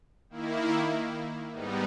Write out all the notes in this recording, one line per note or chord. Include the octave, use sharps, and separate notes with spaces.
D#3 A#3 E4
G#2 G3 B3 D#4